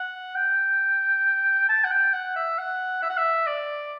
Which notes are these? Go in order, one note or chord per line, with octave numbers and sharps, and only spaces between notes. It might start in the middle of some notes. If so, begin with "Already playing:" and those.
Already playing: F#5
G5
A5
F#5
G5
F#5
E5
F#5
E5
F#5
E5
D5